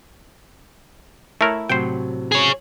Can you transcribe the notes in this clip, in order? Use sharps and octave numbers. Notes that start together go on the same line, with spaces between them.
A3 E4 A#4 C#5
A2 C3 F#3 C5 G5
G#4 C#5